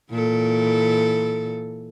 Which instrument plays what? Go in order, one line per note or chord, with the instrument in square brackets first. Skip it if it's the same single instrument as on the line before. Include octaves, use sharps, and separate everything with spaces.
[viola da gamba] A#2 E3 A4